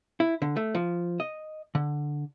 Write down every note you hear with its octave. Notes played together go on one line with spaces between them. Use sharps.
E4
D3
A3
F3
D#5
D3